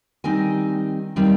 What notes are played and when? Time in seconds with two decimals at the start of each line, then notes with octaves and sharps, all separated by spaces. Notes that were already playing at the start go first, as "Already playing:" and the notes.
0.24 D#3 G3 C4 D#4 G#5
1.16 D#3 G3 C4 D#4